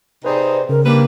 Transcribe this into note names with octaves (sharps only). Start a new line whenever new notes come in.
C3 D#4 G#4 B4 C5 D5
C#3 A#4
G3 A#3 D4 B4